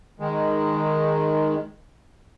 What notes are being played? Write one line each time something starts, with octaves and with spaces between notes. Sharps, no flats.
D#3 G#3